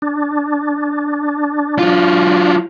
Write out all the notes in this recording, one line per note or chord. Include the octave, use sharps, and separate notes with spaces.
D4
F#3 F4